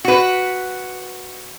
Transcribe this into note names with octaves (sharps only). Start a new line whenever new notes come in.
F#4 B4